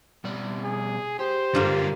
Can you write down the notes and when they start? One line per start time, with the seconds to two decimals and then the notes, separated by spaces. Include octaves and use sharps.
0.24 B2 G3 D5
0.64 G#4
1.19 G4 C5
1.55 G2 D3 A#3 F4